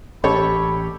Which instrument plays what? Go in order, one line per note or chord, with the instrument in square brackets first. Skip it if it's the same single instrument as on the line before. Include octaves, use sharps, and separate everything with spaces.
[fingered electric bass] A1 C#4 [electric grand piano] G4 [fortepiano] A4 C#5 [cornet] B5